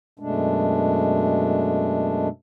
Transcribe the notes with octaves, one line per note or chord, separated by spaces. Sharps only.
F#2 B2 G#3 A3 D4